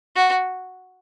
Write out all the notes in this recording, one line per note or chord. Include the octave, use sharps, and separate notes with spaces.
F#4